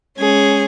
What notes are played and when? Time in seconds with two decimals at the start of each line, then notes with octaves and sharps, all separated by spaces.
0.18 G#3 C#4 G#4